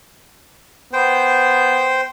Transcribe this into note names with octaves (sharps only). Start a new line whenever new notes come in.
B3 C5 G5